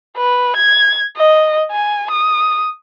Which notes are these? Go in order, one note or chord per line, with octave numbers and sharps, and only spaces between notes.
B4
G#6
D#5
G#5
D#6